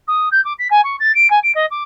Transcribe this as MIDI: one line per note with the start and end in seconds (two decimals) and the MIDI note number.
0.07 0.28 87
0.31 0.43 91
0.44 0.53 86
0.58 0.67 95
0.70 0.81 80
0.84 0.96 85
0.99 1.14 93
1.14 1.29 98
1.30 1.39 80
1.43 1.51 98
1.54 1.65 75
1.70 1.83 86